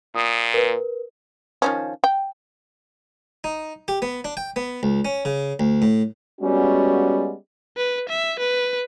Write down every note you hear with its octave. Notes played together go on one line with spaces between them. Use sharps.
A#2 D#6
A#4 B4
D#3 F3 C#4
G5
D#4
G4
B3
D4
G5
B3
C#2
C#4
C#3
D2
A2
G3 G#3 B3 C#4 F#4
B4
E5
B4